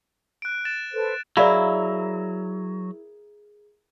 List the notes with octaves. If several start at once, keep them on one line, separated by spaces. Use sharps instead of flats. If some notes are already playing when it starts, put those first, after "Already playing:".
F#6 D7
A6 E7
A4 B4 C5
F#3 E4 G#4 A#4 D5 F5